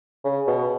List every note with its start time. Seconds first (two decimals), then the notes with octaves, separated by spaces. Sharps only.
0.25 C#3
0.48 B2